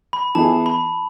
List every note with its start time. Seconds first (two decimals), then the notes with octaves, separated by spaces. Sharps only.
0.13 B5
0.35 E3 B3 E4 G#4 A5
0.66 B5